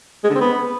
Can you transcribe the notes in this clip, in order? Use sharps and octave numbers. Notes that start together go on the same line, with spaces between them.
G#3
D3
C4
B3